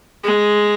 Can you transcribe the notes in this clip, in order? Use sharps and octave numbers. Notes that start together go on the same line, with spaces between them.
G#3